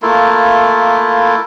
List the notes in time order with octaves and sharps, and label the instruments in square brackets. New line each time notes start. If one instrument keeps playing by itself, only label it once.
[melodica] A3 A#3 E4 F4